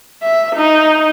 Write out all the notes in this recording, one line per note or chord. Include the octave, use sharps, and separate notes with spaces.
E5
D#4